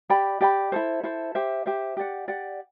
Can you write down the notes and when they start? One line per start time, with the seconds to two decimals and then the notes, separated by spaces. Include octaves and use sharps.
0.10 G4 D5 G5 B5
0.41 G4 D5 G5 B5
0.72 E4 A4 C5
1.03 E4 A4 C5
1.35 G4 C5 E5
1.66 G4 C5 E5
1.97 G4 D5 F#5
2.28 G4 D5 F#5